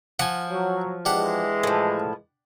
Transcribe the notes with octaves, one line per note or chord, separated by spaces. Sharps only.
F3 F#5 G#5
F#3
E3 G#3 D4 G4 F#5
A2 F3